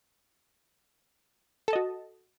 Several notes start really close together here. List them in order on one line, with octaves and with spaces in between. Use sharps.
A4 A5 D#5 F#4